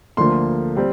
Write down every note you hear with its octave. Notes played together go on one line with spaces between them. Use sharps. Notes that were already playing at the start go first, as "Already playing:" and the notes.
D2 D3 F3 A#3 C6
G3 C4